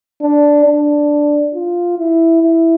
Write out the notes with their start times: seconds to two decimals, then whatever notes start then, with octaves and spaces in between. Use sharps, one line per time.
0.22 D4
0.65 D4
1.54 F4
1.98 E4
2.42 E4